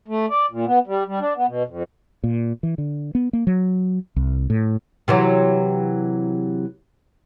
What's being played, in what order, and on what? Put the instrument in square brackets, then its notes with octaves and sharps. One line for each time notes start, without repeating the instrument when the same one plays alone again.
[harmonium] A3
D5
A#2
B3
G3
G3
D4
B3
B2
F2
[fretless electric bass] A#2
E3
D3
B3
A#3
F#3
C2
A2
[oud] C3 E3 F#3